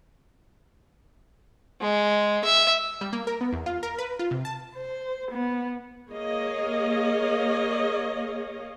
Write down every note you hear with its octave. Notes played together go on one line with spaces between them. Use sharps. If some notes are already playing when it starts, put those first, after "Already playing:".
G#3
E5
G3
A#3
A#4
B3
E2
F4
A#4
B4
F4
C3
A5
C5
B3
A#3 G#4 C#5 D#5 F5